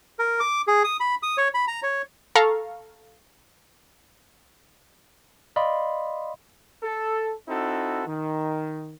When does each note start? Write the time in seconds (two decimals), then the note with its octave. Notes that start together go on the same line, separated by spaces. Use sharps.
0.19 A#4
0.40 D6
0.68 G#4
0.84 D#6
1.00 B5
1.23 D#6
1.38 C#5
1.54 B5
1.68 A#5
1.83 C#5
2.35 A4 F5 A#5 C#6
5.56 D5 D#5 F5 B5 C6
6.82 A4
7.48 C4 D#4 E4 F#4 A4
8.06 D#3